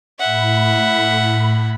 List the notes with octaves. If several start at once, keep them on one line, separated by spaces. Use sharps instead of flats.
A2 E5 F#5 B5